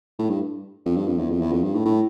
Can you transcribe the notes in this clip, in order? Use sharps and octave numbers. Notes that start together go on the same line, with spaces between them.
A2
G2
F2
G2
F2
E2
F2
E2
F2
G2
A2
A2